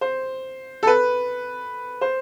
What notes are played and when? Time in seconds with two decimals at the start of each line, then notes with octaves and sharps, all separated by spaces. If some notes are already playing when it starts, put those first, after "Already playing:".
0.01 C5
0.83 A4
0.87 B4
2.01 C5